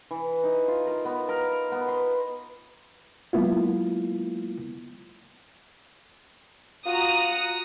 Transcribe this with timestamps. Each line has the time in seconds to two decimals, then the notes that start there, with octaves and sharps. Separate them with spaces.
0.11 E3
0.44 D#4
0.68 F4
0.86 A#4
1.05 B3
1.29 A#4
1.72 B3
1.88 C6
3.33 F#3 G#3 A#3 B3 E4 F4
6.86 F4 F#4 A#5 D#6